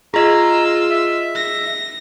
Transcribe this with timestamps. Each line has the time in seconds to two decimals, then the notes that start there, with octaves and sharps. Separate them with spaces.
0.14 F4 G#4 D#5 A#5 E6
0.91 E5
1.35 A#6